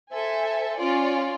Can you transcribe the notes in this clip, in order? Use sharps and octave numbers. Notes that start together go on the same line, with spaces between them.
A4 C5 E5 G#5
C#4 F4 D5